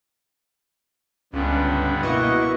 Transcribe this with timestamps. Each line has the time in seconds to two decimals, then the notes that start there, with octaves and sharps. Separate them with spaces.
1.33 C#2 G2 D3 B3 C#4
2.03 B2 A#3 E4 F#4 B4 D#5 C#6